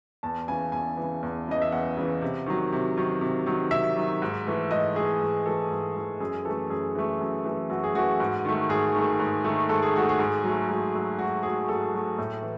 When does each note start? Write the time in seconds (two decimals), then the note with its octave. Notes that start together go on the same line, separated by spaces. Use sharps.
0.23 E2 A5
0.48 C#3 E3 G#5
0.72 E2 G#5
0.97 C#3 E3
1.23 E2
1.48 C#3 E3 D#5
1.62 E5
1.72 E2 F#5
1.97 C#3 E3
2.21 C3
2.46 D#3 F#3
2.72 C3
2.97 D#3 F#3
3.21 C3
3.46 D#3 F#3
3.71 C3 E5
3.96 D#3 F#3
4.22 G#2
4.47 E3 A3
4.71 G#2 D#5
4.95 E3 A3 G#4
5.21 G#2
5.46 E3 A3 A4
5.70 G#2
5.96 E3 A3
6.20 F#2 G#4
6.45 E3 A3 A4
6.70 F#2 G#4
6.95 E3 A3
7.20 F#2
7.44 E3 A3
7.70 F#2 F#4
7.84 G#4
7.95 E3 A3 F#4
8.20 G#2
8.45 D#3 A3
8.69 G#2 G#4
8.95 D#3 A3
9.19 G#2
9.44 D#3 A3
9.69 G#2 A4
9.82 G#4
9.93 D#3 A3 F#4
10.09 G#4
10.19 G#2
10.43 F#3 A3
10.69 G#2
10.94 F#3 A3
11.18 G#2 F#4
11.43 F#3 A3 G#4
11.68 G#2 A4
11.94 F#3 A3
12.18 A2
12.42 E3